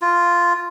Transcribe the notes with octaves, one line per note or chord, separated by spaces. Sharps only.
F4